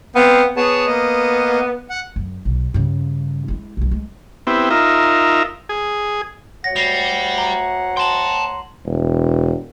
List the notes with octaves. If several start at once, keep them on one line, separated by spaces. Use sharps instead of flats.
B3 C4 C5 F5
B3 G#4 C#5 A5
A#3 D#5
F#5
F#2
B1
G2 C#3
G#3 E4
B1 F#2
G#3
B3 C4 E4 G4
D#4 F4 A#4 E5
G#4
D2 C#5 F#5 A#6
G3 A#6 C7 F7
A#5
G5 A5 C6 F#7
E1